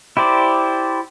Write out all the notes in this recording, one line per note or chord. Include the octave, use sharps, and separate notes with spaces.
E4 G4 C5 D5